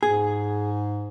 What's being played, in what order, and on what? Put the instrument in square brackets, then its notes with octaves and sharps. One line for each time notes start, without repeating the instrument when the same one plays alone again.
[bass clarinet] G#2 [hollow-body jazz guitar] G#4